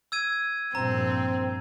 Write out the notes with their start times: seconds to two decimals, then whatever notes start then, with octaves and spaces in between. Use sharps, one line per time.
0.12 E6 G#6 D#7
0.75 G2 A#2 F3 C4 A#5